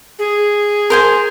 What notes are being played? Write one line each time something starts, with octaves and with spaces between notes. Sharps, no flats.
G#4
A#4 C5 G#5